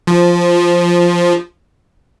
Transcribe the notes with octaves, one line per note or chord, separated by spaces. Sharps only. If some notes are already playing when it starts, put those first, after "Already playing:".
F3